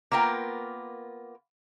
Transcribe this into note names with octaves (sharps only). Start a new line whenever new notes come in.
A#3 B3 F4 A#4 G5